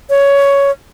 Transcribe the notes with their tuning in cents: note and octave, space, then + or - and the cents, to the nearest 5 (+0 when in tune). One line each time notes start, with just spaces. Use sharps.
C#5 +10